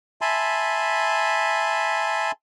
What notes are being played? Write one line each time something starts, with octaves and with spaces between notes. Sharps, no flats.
E5 G#5 A5 B5 C6